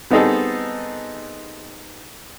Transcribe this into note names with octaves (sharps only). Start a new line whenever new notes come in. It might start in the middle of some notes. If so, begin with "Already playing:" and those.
G3 B3 C4 D#4 G#4 A4